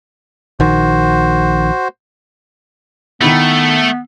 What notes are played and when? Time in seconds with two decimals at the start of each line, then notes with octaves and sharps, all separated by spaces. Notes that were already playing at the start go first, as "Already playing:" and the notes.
0.60 A#1 D#3 F#4 C5
3.21 D#3 A3 B3 E4